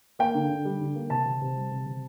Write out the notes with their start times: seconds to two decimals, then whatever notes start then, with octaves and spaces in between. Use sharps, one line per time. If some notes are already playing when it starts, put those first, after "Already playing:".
0.19 A#3 G5
0.35 D3
0.50 D3
0.65 G3
0.80 D3
0.95 A#3
1.10 C3 A5
1.26 C3
1.41 C3
1.56 G3
1.71 C3
1.86 C3